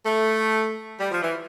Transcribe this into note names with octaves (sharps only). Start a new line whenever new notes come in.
A3
G3
F3
E3